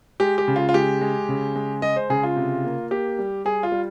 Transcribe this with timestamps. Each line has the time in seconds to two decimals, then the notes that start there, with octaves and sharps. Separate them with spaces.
0.20 G#3 G4
0.38 G4
0.48 C#3
0.56 F4
0.69 F4
0.74 G#3 G4
1.01 G#3
1.29 C#3
1.56 G#3
1.82 G#3 D#5
1.96 C5
2.10 C#3 G#4
2.23 F4
2.36 C3
2.64 A#3
2.91 A#3 G4
3.19 G3
3.45 G3 G#4
3.63 F4
3.72 G3